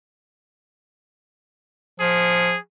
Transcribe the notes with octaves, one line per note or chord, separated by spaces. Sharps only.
F3 G#4